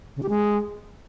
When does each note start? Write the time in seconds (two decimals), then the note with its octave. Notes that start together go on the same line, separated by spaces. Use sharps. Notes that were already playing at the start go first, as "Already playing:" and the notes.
0.16 C#3
0.23 G4
0.29 G#3